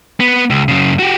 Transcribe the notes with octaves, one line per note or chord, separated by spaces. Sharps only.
B3
C#2
F#2 C#3
F#4 G4